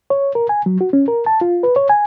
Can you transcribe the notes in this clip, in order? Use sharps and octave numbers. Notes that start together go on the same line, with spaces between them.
C#5
A#4
G#5
F#3
F#4
C#4
A#4
A5
F4
B4
C#5
G#5